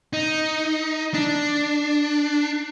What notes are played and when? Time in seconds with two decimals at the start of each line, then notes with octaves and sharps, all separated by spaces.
0.13 D#4
1.14 D4